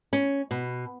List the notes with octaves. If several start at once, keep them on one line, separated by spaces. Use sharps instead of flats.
C#4
B2